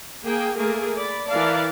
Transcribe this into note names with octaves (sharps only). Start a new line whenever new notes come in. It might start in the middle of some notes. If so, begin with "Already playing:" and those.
A#3 G#4 G5
A3 A#3 G#4 A#4
D5 B5
E3 E4 A#4 D5 F5 A5